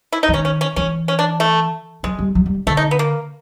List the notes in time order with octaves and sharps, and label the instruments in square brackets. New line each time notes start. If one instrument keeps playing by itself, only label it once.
[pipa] E4
D#4
[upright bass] D#3
[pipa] C#4
C#4
C#4
[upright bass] E3 [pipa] C#4
[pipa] C#4
D4
A3
[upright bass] F#3 [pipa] G#3
[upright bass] G3
F#3
G3
[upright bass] D3 [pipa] A3
[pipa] D#4
B3
A#3